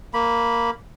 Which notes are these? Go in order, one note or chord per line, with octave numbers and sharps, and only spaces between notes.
A#3 B5